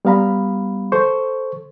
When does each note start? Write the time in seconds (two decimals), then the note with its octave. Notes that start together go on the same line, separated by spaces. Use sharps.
0.05 G3 B3 F5 A#5 B5
0.92 A4 C5 C#6